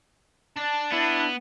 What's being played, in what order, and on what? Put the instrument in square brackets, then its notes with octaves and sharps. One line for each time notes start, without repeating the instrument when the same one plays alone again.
[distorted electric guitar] D4 [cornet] A5
[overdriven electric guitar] B3 [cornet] E4